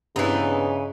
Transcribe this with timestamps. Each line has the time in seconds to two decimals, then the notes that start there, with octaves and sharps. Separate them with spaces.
0.16 G2 C#3 E3 B3 C4 D4 D#4